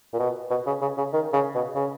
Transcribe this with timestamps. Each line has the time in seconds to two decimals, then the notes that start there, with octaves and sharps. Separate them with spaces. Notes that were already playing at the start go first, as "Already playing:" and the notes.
0.13 A#2
0.19 B2
0.50 B2
0.67 C#3
0.82 C#3
0.98 C#3
1.13 D#3
1.33 C#3
1.55 B2
1.75 C#3